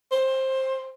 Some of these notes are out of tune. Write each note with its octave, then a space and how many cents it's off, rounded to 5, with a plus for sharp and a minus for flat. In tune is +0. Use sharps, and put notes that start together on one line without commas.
C5 +15